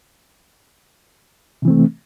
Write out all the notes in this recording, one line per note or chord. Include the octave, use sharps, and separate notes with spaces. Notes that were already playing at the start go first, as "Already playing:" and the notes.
C3 E3 A3 C4